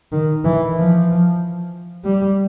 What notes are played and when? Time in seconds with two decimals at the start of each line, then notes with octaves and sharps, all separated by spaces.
0.12 D#3
0.44 E3
0.76 F3
2.05 G3